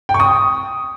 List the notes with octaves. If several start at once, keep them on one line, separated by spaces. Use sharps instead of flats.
G5
C#6
D#6